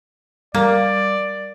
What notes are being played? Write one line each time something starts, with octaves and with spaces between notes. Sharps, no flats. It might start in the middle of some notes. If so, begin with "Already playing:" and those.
G3 A#3 D5